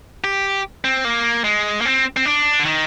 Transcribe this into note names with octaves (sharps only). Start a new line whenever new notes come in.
G4
C4
A#3
G#3
A#3
C4
C4
D4
D3
D#3